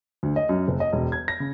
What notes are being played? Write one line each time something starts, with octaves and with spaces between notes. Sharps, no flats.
D2
D#5
F#2
F#1
D#5
E1
G#6
A#6
C#3